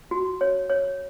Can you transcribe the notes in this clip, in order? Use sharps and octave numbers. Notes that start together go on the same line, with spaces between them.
F#4
C#5
C#5